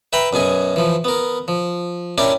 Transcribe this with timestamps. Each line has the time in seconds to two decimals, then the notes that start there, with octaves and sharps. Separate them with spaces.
0.13 B4 E5 G5 A#5 B5
0.33 F#2 B2 G#4 G#5
0.76 E3 F3
1.04 B3 A#4
1.48 F3
2.18 C#4 D4 E4 G4 A#4